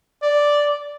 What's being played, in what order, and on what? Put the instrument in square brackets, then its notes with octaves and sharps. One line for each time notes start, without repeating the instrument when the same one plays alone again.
[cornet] D5